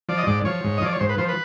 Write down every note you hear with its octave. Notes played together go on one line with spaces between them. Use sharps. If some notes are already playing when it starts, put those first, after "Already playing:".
F3 D5
D#5
G#2 D5
F3 C#5
G#2
D#5
F3 D5
C#5
G#2 C5
B4
F3 C5
B4